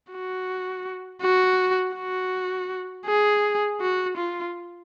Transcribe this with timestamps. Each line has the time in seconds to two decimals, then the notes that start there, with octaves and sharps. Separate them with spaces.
0.11 F#4
1.22 F#4
1.96 F#4
3.06 G#4
3.81 F#4
4.17 F4